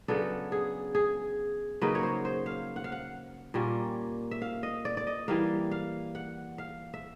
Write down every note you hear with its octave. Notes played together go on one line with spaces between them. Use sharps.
C#3 F#3 B3 D4 A4
G#4
G#4
C#3 F#3 A#3 D#4 B4
C#5
C5
C5
F5
F#5
F5
F#5
A#2 G3 A#3 C#4
E5
F5
D#5
D5
D5
D#5
E3 G3 A#3 F5
F5
F#5
F5
E5